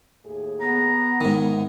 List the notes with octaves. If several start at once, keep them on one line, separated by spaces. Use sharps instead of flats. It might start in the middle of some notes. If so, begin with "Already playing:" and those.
D#2 A2 G#4
B3 A#5
G#2 D#3 E3 A#4